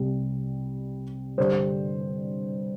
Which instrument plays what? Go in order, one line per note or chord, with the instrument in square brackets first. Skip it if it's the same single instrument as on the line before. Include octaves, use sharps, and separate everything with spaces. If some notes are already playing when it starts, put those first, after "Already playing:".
Already playing: [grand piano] C2 C3 G3
G2 D3 G3 C5